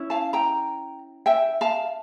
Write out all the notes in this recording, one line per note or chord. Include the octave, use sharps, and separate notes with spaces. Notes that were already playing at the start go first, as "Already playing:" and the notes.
Already playing: C#4 E4
F5 A5
G5 A#5
E5 G5
F5 A5